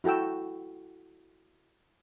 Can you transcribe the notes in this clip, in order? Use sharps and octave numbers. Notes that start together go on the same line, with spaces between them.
E4 F#4 A4 G5 E6